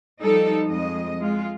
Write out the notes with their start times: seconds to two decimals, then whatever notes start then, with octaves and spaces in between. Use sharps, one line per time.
0.21 F3 G3 D#4 A4
0.66 F2 G#3 D#5
1.20 G#3 F4